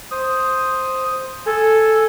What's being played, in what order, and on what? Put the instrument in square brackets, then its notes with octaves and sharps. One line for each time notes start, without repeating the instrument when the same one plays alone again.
[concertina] C5 D#6
[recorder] A4 [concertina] G#5